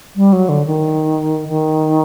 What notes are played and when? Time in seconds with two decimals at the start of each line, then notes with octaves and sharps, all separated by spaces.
0.16 G3
0.33 F#3
0.49 D3
0.66 D#3
1.48 D#3